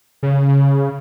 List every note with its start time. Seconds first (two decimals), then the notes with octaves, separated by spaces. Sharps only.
0.23 C#3